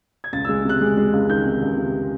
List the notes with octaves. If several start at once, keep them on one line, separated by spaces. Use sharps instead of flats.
G#6
C#2 A6
E6
G#3
C3 F#6
G#3
G#3
C#2
D#3 G6
C3
C#2
C3